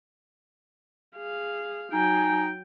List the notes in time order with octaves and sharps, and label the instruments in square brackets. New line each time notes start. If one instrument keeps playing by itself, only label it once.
[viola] G#4 F5
[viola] F#3 G5 [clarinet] D#4 [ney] G#5